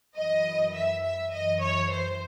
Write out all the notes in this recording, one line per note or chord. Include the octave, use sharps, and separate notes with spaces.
F#2 E3 D#5
E5
E5
F#2 E3 D#5
C#5
C5